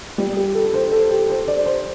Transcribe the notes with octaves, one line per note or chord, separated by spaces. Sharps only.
G3
G4
A4
C5
A4
G4
C5
D5
C5